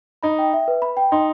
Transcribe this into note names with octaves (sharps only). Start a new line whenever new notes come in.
D#4 B5
G5
E5
B4
B5
G5
D#4 C6